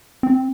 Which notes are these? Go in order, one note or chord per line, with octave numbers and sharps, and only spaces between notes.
C4